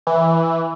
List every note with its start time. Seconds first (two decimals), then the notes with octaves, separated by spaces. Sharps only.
0.07 E3